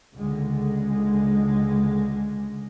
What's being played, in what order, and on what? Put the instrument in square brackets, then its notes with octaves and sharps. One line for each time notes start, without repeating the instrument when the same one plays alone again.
[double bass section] C#2 D3 G#3